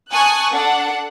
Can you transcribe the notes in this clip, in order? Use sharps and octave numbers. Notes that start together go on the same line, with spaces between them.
G#5 A5 C#6 D#6 F#6
D4 A4 F#5